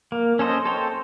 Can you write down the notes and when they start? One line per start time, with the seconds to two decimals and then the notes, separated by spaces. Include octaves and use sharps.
0.12 A#3
0.39 C#4 A4 C5 D#5
0.65 A4 C5 C#5 G5